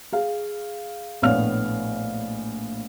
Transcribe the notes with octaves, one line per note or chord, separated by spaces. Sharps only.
G#4 F5
A#1 A2 B3 C#5 F5 F6